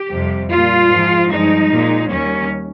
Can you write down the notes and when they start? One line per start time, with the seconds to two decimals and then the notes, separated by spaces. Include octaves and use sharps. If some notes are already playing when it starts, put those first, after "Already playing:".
Already playing: G4
0.11 F2 C3 G3
0.50 A#2 G3 F4
0.90 G#2 F3 G#3
1.30 G2 F3 G#3 D#4
1.70 A#2 G#3
2.09 D#2 D#3 G3 C#4